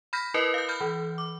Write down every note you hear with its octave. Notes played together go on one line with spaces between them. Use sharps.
B5 F6 G6 A#6 B6
E4 A#4 B4 D#5
F5 G6
B5 F6 G6
E3
D6